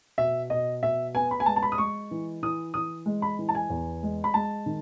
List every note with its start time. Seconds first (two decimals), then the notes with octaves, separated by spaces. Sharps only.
0.18 B2 E5
0.50 B2 D#5
0.83 B2 E5
1.15 B3 G#5
1.31 B5
1.40 G#5
1.46 G#3 A5
1.56 A5
1.63 B5
1.72 D#6
1.78 G#3 C#6
2.11 E3
2.42 E3 D#6
2.74 E3 D#6
3.06 G#3
3.22 B5
3.39 E3
3.49 A5
3.55 G#5
3.70 E2
4.03 G#3
4.24 B5
4.34 G#3 A5
4.66 D#3